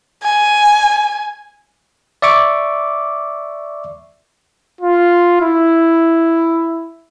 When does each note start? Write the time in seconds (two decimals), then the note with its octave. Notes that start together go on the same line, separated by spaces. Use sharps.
0.23 G#5
2.22 D5 E5 C#6 D6
4.81 F4
5.41 E4